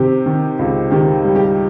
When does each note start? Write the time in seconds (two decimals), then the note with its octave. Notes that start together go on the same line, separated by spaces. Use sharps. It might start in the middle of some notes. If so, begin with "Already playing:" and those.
Already playing: C3 D#3 G4
0.26 D#3
0.59 C#2
0.91 D#3 G4
1.25 G3
1.36 G4